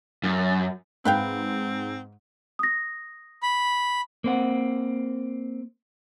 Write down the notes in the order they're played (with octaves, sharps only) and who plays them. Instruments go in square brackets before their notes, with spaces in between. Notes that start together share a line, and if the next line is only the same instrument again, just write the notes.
[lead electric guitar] F#2
[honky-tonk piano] G#2 [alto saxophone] C4 [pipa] B4 F5 G5
[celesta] D#6 A#6
[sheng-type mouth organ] B5
[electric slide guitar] A#3 C4 F#5